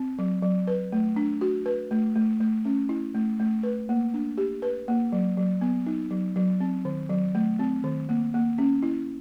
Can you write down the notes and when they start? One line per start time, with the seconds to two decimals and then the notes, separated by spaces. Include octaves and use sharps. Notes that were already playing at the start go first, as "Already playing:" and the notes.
Already playing: C4
0.19 F#3
0.43 F#3
0.67 B4
0.93 A3
1.16 D4
1.41 F#4
1.66 B4
1.91 A3
2.16 A3
2.40 A3
2.65 C#4
2.89 E4
3.14 A3
3.40 A3
3.63 B4
3.89 A#3
4.14 D4
4.37 G4
4.62 B4
4.88 A#3
5.12 F#3
5.37 F#3
5.61 B3
5.86 D#4
6.11 F#3
6.36 F#3
6.60 C4
6.85 D#3
7.10 F#3
7.35 A3
7.59 C4
7.84 D#3
8.09 A#3
8.34 A#3
8.58 C#4
8.83 E4